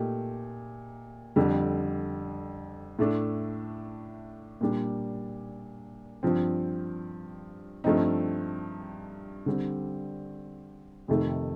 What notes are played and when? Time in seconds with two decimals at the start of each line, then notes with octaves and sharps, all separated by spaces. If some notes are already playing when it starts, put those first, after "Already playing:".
Already playing: A#2 A3 D#4 G4
1.36 F2 D3 G3
2.99 A2 A3 D4
4.61 A#2 G3 D4
6.23 G2 F3 C4
7.84 G2 F3 A3 C4 D#4
9.46 D3 G3 C4
11.08 F2 C3 D#3 A3